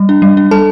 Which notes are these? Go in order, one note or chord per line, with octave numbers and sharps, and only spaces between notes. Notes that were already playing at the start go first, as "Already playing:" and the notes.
Already playing: G3
D4
G3
D4
G3 A4 A5